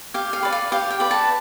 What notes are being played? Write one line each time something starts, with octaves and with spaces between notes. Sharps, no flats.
G4 F5
F5
B4 D5
F5
G4 F5
G5
B4 D5
A5